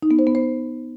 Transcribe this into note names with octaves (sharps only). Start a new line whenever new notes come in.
D#4
B3
C5
B3
C5